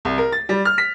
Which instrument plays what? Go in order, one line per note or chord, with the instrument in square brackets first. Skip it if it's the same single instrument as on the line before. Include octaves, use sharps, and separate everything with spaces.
[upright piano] C2
A#4
A6
G3
F6
B6